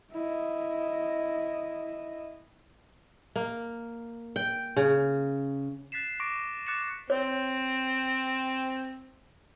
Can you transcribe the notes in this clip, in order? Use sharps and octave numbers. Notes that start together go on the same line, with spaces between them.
E4 D#5
A#3
G5
C#3
F#6 A6 B6 C7 E7
C#6 D6 A6 A#6 D7 E7
D6 F#6 A6 C#7 E7
C4 C#5